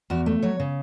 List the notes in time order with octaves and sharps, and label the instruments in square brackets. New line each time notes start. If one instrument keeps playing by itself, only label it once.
[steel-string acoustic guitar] E2 F#4
A3
F#3 C#5
C#3